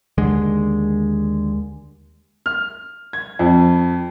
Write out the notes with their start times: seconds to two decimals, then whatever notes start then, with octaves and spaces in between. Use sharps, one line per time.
0.18 D#2 D3 G#3
2.46 F6
3.13 G#6
3.39 F2